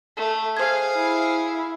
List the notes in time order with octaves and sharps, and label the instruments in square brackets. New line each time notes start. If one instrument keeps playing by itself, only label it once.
[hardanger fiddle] A3
[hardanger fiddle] G#4 F5 [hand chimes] C5 G#6
[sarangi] E4